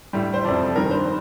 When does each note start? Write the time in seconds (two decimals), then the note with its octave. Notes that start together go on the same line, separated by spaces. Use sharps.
0.13 A2 G3
0.34 C5
0.44 F2 C3 F3 D5
0.75 G2 D#3 G3 A#4
0.91 C5